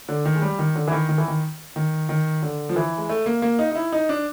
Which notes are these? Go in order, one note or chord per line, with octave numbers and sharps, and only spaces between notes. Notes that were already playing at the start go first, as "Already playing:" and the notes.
D3
D#3
G#3
G3
D#3
D3
E3
D#3
D#3
E3
D#3
D#3
D#3
D3
F3
E3
G#3
A3
A#3
A#3
D#4
D#4
E4
D#4
D4